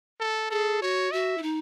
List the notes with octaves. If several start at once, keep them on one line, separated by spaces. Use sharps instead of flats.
A4
G#4 A4
F#4 C#5
F#4 E5
E4
D#4